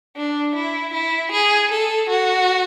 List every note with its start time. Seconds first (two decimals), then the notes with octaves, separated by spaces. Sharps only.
0.16 D4
0.56 E4
0.94 E4
1.32 G#4
1.71 A4
2.10 F#4